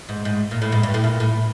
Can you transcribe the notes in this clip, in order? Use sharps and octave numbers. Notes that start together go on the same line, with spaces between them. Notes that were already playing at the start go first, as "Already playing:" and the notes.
G#2
G#2
A#2
A2
G#2
G2
A2
A#2
A2